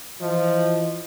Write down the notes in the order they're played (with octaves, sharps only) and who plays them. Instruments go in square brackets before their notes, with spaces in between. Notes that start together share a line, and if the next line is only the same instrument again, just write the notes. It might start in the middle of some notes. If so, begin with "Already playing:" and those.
[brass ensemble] E3 F4 D#5 [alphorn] F3